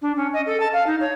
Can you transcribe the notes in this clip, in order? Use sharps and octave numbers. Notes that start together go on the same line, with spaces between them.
D4
C#4
D#5
A4
A5
F5
D#4
C#5